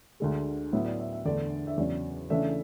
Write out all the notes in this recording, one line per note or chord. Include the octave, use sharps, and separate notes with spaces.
D2 D3 G#3
A2 F#3 B3 E4 E5
D5
E5
E5
E2 D3 A3 D5
E5
E2 C#3 F#3 D5
C#3 E3 A3 D4 E5